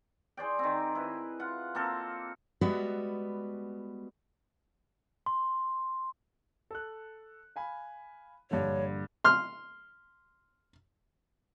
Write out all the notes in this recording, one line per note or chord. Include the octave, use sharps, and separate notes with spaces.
G#4 C5 D5 G5
D#3 C4
E4 B4
F4 F#5
A#3 C4 A4
G3 G#3 B3 F#4 B4 E5
C6
A4 F#6
F5 G#5 B5
A#1 G2 D3 C#5
C6 F6